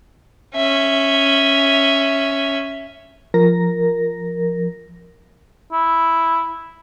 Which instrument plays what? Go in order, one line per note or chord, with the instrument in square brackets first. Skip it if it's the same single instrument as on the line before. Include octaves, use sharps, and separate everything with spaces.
[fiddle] C#4 E5
[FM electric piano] F3 A#4 A#6
[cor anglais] E4